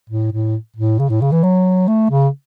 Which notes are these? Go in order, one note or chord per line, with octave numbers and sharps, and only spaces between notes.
A2
A2
A2
C#3
A2
C#3
E3
F#3
A3
C#3